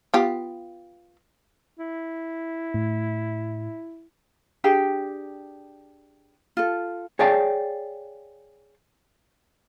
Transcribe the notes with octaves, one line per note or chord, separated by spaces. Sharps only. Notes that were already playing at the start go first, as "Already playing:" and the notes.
B3 F4 G4
E4
A2
D4 G4 G#4 G5
F4 A4
G#4 C#5 D5 F5 G5 A5